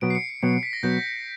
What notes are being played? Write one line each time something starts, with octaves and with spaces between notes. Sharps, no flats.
B2 F#3 B3 D7
C7
C#7
C#7
B2 F#3 B3 C#7
C#7
B6
A#6
B2 F#3 B3 G6